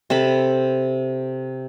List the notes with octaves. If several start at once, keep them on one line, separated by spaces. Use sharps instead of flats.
C3 A4 A5 B5